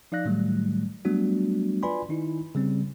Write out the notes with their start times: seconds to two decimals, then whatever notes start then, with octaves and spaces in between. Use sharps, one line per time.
0.12 F3 D#4 D5 F5 F#6 A#6
0.25 A2 D#3 F#3 G3 A3
1.05 F#3 G3 A3 B3 D4 F#4
1.83 F4 B4 D5 G#5 B5 C6
2.09 D#3 D#4 E4
2.55 C#3 G3 C4